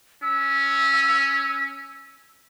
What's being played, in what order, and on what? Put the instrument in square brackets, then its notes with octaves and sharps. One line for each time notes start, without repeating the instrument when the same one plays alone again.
[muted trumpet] C#4 [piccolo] E6